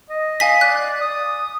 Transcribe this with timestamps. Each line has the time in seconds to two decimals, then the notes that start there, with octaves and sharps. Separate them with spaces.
0.10 D#5
0.40 F5 G#5 B6
0.61 D5 F#6
1.01 D#6